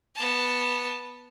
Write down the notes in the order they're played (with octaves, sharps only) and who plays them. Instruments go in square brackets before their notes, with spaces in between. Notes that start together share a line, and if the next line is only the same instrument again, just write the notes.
[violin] B3 A5